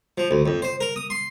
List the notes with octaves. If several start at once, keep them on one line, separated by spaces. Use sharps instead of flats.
F3
D2
F2
C5
A#4
D#6
C6